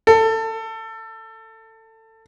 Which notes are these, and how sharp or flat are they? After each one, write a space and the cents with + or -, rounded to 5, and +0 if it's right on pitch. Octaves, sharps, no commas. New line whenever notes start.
A4 +20